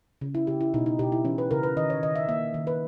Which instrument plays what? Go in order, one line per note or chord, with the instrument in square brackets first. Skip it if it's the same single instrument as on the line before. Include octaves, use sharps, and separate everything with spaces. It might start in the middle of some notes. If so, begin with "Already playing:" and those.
[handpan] C#3
E4
C#3 G4
E4
B2 D#4
D#4
B2 G4
E4
E3 C#4
B4
C#3 A#4
B4
D#3 D#5
C#5
D#3 D#5
E5
A#3 E5
D#3
B4